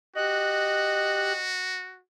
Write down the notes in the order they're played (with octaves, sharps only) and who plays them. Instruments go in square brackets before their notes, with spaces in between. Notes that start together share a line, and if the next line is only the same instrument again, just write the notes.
[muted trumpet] F#4 [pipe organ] G4 F#6 [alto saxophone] D#5